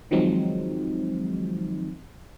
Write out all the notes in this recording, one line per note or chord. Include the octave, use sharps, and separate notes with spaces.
D#3 F3 F#3 G#3 C4 D#4